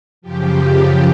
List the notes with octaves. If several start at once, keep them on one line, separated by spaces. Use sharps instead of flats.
F#2 C#3 F3 G4